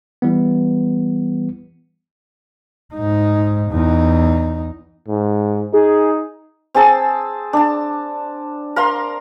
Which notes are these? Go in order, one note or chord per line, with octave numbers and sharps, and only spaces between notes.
E3 G3 B3
G#2 D#4
E2 D#4
G#2
D#4 G#4
C4 G#4 A5 E6
D4 A5
A#4 F5 A#5 C6